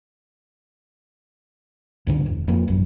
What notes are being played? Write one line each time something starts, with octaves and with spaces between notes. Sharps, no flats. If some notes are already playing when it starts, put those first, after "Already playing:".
C#2 G2 D3
E1
F2 F3 A#3
A1 F#2